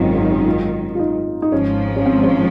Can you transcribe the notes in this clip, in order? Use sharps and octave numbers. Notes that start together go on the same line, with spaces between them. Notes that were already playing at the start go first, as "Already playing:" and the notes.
Already playing: G#1 F#2 D#3 C4 C#4 D#4 F4
F4
D#4
C#4
D#4
F4
F4
D#4
D#4
G#1 G#2 F3 C#4
C#4
C4
C#4